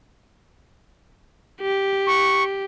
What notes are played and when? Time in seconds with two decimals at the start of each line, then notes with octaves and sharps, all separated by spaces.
1.61 G4
2.07 C#6